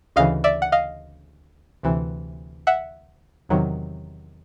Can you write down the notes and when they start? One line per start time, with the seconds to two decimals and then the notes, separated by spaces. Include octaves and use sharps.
0.16 D2 C#3 E3 D#5 F5
0.44 D5 E5
0.62 F#5
0.72 D#5 F5
1.83 D2 C3 E3
2.67 E5 F#5
3.49 E2 C3 D#3 F#3